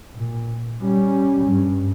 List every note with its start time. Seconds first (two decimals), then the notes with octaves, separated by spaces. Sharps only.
0.14 A#2
0.81 G3 C#4
1.45 G2